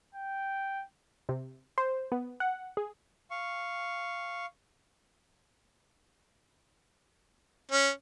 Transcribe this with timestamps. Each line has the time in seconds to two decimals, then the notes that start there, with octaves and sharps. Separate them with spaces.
0.15 G5
1.29 C3
1.78 C5
2.12 B3
2.40 F#5
2.77 G#4
3.31 F5 C#6
7.72 C#4